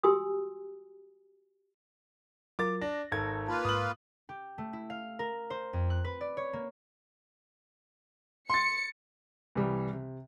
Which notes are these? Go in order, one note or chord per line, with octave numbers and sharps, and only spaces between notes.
F#4 G4 G#5 C6 D#6 E6
F#3 F4 A#4 D6 A6
D4 A#6
G#1 A4 G#6
A#3 F4 B4 A5
G#2 D#6 F#7
G4
A3
E4
F5
A#4
C5
F2
F#6
B4
D5
C#5
A#3
C6 A6 C#7
C2 E3 G3
C3